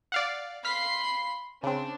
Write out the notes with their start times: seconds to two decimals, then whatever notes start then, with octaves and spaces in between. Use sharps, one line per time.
0.12 D5 F5 F#5
0.65 F5 B5 C6 B6 C7
1.63 C#3 C4 D4